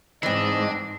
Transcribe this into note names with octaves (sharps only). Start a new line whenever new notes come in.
G#2 E3 C4 D4 D#5 E6